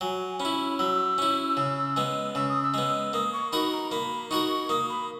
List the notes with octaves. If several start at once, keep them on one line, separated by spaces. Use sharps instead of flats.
F#3 G#5
C#4 B5
E4
F#3 E6
C#4 E4
C#3
G#3 B3
C#3 E6
D#6
E6
G#3 B3
A#3 D#6
C#6
D#4 F#4 A#4 B5
A#5
A#3 B5
D#4 F#4 A#4 C#6
A#3 D#6
B5